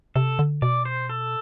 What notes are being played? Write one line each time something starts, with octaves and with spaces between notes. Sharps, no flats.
C3 A4
D3
B2 D5
C5
A4